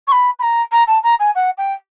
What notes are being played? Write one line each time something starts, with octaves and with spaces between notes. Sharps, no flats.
C#6
B5
B5
A#5
A#5
A5
A#5
G#5
F#5
G5